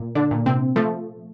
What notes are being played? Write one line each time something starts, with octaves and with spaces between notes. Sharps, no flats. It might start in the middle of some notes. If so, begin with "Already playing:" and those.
Already playing: A#2
D3 D4
A#2
C3 C4
F3 A3